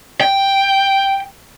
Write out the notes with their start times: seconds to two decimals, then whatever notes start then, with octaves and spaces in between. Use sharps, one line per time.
0.21 G5